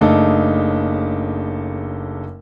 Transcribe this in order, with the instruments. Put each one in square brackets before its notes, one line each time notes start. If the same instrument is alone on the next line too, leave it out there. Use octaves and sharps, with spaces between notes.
[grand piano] F#1 C#3 A3 D4 D#4